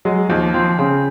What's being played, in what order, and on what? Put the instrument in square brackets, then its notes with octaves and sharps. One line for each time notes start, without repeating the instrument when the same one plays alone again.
[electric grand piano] F#3 [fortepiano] G#3
[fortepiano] D#2 [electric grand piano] F3
[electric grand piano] F3 [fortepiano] C4
[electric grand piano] C#3 [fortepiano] C4